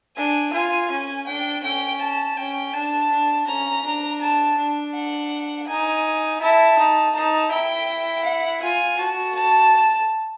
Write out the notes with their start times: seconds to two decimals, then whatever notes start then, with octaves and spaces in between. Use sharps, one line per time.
0.16 D4 G#5
0.53 F4 G#5
0.91 C#4
1.27 D4 G5
1.64 C#4 G5
2.01 A5
2.37 C#4 G5
2.73 D4 A5
3.11 D4
3.47 C#4 A#5
3.84 D4
4.21 A5
4.57 D4
4.95 F#5
5.67 D#4 G#5
6.41 E4 A5
6.78 D#4
7.15 D#4 A5
7.51 E4 G5
8.25 F#5
8.62 F4 G#5
8.99 F#4 A5
9.35 A5